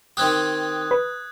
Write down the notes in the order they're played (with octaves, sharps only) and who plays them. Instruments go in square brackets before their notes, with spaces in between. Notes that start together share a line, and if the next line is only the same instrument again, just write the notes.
[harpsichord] D#3 C4 G4 [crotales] D#6 F#6 G#6
[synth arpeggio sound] B4